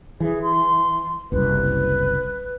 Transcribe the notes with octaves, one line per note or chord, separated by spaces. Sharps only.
E3 G#4
C6
F#1 C2 B4